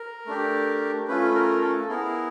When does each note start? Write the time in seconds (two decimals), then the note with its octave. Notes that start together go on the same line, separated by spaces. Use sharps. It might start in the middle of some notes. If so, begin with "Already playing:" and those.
Already playing: A#4
0.26 A3 D4 G4
1.08 A3 C#4 F4 B4
1.35 A#4
1.61 A4
1.88 B3 E4 G#4 A#4